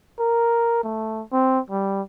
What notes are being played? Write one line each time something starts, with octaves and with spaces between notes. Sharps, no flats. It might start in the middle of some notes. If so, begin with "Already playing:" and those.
A#4
A3
C4
G3